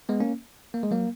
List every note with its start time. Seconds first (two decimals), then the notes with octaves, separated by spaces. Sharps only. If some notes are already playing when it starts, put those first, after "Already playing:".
0.09 G#3 B3
0.20 A#3 C#4
0.74 A#3
0.83 G#3
0.91 F#3 A#3